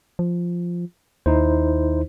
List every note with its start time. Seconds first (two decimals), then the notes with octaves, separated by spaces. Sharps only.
0.19 F3
1.26 D#2 D#4 E4 C5